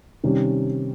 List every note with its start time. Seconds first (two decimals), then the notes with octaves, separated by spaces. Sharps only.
0.24 C3 D#3 G3 C#4 G4